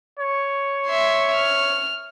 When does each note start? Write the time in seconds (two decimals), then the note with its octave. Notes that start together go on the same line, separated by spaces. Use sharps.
0.19 C#5
0.87 E5 C6
1.34 F6